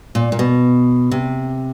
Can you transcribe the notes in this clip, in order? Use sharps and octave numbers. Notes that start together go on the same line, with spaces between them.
A#2
A#2
B2
C3